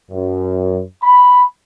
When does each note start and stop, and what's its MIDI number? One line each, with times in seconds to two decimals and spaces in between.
0.10 0.80 42
1.03 1.42 83